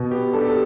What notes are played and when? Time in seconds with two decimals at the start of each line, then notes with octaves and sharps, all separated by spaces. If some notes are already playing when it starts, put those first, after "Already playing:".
Already playing: B2
0.11 B3 G4
0.33 D4 A4
0.41 G4
0.48 A4